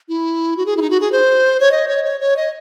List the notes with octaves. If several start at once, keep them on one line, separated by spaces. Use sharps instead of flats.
E4
F#4
G#4
E4
D#4
F#4
G#4
C5
C#5
D#5
C#5
C#5
C#5
D#5